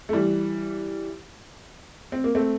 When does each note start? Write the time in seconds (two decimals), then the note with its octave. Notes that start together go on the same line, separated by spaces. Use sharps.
0.09 A3
0.13 E3 G3
2.12 C4
2.24 A#3
2.35 A3 C4